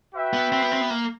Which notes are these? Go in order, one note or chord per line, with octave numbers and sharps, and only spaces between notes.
F#4 B4 E5 G5
B3
C4
B3
C4
B3
A#3